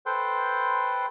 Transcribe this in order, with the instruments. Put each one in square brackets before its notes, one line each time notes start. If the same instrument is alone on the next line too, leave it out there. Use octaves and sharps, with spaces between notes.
[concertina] A4 B4 C5 G5 C6